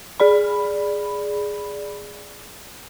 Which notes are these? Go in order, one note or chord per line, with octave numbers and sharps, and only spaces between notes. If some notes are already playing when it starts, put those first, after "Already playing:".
G#4 D5 B5